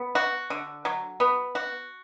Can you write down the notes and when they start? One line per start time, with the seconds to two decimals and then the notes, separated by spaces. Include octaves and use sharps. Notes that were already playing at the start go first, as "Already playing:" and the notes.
Already playing: B3
0.15 F#4
0.50 D3
0.85 F#3
1.20 B3
1.55 F#4